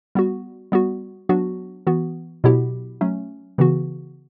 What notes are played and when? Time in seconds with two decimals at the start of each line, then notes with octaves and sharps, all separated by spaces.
0.15 G3 B3 F#4
0.72 G3 B3 F#4
1.29 F#3 B3 D4 F#4
1.87 E3 B3 F#4
2.44 B2 F#3 B3 E4 G4
3.01 F#3 A3 C#4
3.58 C#3 E3 B3 F#4